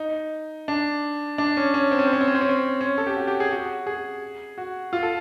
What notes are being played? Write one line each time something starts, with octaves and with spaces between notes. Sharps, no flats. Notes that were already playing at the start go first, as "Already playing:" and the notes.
Already playing: D#4
D4
D4
C#4
C#4
C4
C#4
C4
C#4
C4
C#4
C4
C#4
C4
C#4
A4
G4
F#4
G4
G#4
F#4
G#4
F#4
F4
A4